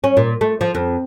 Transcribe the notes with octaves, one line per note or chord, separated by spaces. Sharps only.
C#4
A#2
A3
F3
F2